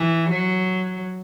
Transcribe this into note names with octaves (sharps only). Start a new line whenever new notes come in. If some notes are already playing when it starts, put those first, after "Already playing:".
Already playing: E3
F#3